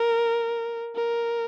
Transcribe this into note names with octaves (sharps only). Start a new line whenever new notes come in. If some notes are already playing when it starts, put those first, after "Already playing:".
Already playing: A#4
A#4